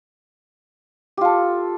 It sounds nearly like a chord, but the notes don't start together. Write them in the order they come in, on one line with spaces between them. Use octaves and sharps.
G4 F4 A4